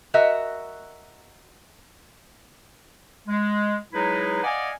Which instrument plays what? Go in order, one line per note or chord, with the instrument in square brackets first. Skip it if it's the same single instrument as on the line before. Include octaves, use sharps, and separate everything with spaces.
[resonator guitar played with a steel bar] F#4 A#4 D#5 E5
[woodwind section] G#3
F#3 G#3 D#4 E4 G#4 B4
D5 D#5 F5 F#5 G#5